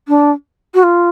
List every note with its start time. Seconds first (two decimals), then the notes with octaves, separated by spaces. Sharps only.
0.08 D4
0.74 F#4
0.83 F4